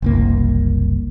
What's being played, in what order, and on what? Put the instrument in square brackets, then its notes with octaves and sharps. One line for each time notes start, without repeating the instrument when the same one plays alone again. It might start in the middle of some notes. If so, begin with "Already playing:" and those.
[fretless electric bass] F#1 C2 A#3